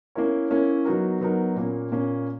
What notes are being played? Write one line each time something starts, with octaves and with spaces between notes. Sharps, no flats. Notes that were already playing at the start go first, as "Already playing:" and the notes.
A#3 C#4 E4 A#4 C#5
A#3 C#4 E4 A#4 C#5
F#3 B3 D#4 F#4 A#4
F#3 B3 D#4 F#4 A#4
A#2 A#3 C#4
A#2 A#3 C#4